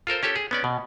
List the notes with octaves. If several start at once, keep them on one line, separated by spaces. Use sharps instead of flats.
F4 A4 A#4 C5
C#4 G4 A4 C#5
G#4
B3 C#4 D5
B2